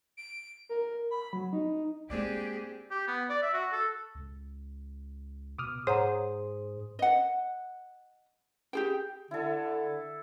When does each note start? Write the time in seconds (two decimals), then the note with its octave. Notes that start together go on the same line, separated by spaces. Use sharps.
0.17 D7
0.69 A#4
1.11 B5
1.33 F#3
1.53 D#4
2.10 G#3 A#3 C4 D4 G4 G#4 D5
2.91 G4
3.08 B3
3.29 D5
3.42 E5
3.53 F#4
3.72 A4
4.15 C#2
5.59 B2 D6 D#6 F6
5.87 G#2 G#4 C5 C#5 F#5 A#5 D#6
6.99 D#5 F#5
8.73 G4 G#4 G5
9.31 D3 E4 A4